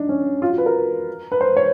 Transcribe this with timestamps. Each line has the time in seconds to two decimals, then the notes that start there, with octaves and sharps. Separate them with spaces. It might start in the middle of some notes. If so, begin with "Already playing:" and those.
Already playing: D4 D#4
0.09 C#4
0.42 F4
0.50 F#4
0.58 B4
0.66 A#4
1.32 B4
1.41 C5
1.57 C#5